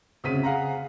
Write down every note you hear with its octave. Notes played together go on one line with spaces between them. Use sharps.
D2 C#3 C4 B6 D#7
G#4 F5 F#5 A#5